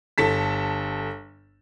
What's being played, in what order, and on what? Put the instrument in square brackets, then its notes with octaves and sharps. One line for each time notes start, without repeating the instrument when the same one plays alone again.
[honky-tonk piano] G1 A4 A5 B6